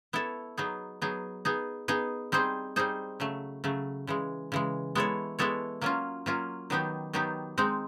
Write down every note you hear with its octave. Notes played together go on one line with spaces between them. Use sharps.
B3 E4 A4 C#5
F#3 B3 D#4 G#4
F#3 B3 D#4 G#4
B3 D#4 G#4
B3 D#4 G#4
G3 C4 D#4 G#4 C5
G3 C4 D#4 G#4 C5
C#3 F#3 A3
C#3 F#3 A3
C#3 E3 G#3
C#3 E3 G#3
G#3 B3 E4 A4 C#5
G#3 B3 E4 A4 C#5
F#3 A#3 C#4 F4
F#3 A#3 C#4 F4
D#3 F#3 B3 D#4 G4
D#3 F#3 B3 D#4 G4
G#3 C4 D#4